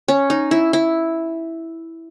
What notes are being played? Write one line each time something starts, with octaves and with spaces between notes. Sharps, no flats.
C#4
D#4
E4
E4